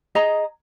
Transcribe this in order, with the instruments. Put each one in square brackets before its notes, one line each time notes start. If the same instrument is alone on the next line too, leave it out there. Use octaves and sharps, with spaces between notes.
[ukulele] G#4 D#5 A#5